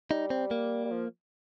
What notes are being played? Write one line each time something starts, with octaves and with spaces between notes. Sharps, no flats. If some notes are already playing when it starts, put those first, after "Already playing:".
G3 D#4
C4
A#3
G3
F3